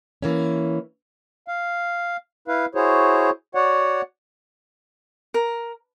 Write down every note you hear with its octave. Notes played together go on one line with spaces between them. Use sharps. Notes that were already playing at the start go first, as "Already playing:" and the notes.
E3 A#3 C#4
F5
E4 B4 F5
E4 F#4 G#4 C5 C#5
F#4 C#5 D5 F#5
A#4